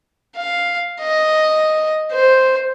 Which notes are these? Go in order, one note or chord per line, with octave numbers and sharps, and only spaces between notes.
F5
D#5
C5